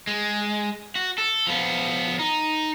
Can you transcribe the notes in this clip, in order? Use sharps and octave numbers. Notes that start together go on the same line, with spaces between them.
G#3
F#4
A4
F3 B3
D#4